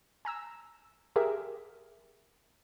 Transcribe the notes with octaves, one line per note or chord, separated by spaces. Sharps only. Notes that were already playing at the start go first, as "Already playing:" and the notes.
G#5 A#5 E6
G4 G#4 A#4 E5